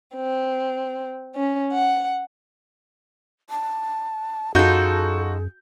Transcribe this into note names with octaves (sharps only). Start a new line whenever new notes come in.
C4
C#4
F#5
A5
F#2 D#4 F4 F#4 G#4 A4 G6